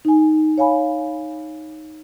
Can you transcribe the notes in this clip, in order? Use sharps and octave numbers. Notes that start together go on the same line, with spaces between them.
D#4 G#5
C#5 F5 G#5 B5